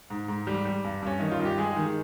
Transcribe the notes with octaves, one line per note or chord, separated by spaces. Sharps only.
G#2
G#2
G3
G3
G2
G2 C#4
D#3 D#4
F4
G2
G4
G#3 G#4
D#3